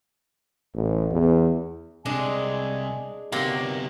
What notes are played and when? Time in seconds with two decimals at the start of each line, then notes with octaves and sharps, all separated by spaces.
0.75 A1
1.12 E2
2.06 C2 C3 G#3 D4 G#5
3.32 C3 D#3 F#3 A#3 B3 G4 C6